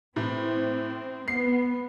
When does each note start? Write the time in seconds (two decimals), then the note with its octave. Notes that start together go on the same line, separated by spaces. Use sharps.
0.16 A2 E3 C4
1.28 B3 C7